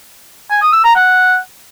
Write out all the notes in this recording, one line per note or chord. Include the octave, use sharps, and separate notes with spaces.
G#5
D#6
E6
A#5
F#5